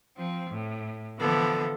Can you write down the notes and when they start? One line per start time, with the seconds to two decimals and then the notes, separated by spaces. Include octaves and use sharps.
0.16 F3 C4
0.50 A2
1.20 D3 E3 F3 B3 A4